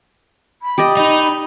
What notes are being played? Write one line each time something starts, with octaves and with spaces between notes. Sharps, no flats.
B5
G4 D5 D#5
D#4 B5